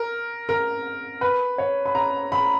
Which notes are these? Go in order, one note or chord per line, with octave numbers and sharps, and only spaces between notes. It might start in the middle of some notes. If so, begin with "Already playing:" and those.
Already playing: A#4
A#4
B4
C#5
B5
A#5
B5